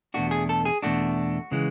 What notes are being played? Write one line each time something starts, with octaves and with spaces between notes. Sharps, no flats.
E2 B2 A3 D4 F#4
G#4
A4
G#4
E2 B2 A3 D4 F#4
C#3 E3 G#3